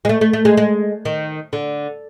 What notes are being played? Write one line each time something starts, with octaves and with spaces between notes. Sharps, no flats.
G#3
A3
A3
A3
G#3
G#3
D#3
D3